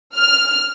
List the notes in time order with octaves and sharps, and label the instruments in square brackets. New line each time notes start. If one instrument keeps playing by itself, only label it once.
[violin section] F6